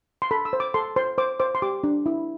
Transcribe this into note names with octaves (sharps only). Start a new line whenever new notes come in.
C6
A4 B5
E6
C5
D6
A4 C6
C5 C6
C5 D6
C5 D6
C6
G4 D6
D4
E4